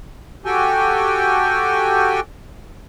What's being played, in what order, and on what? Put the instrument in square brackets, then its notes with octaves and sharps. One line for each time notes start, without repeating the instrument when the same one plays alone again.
[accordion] F#4 G4 A4 G5 G#5